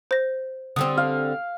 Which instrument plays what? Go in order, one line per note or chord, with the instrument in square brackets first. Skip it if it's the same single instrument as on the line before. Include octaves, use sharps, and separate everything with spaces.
[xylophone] C5 A#6
[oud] D3 G3 C4 [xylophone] D#6
[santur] F5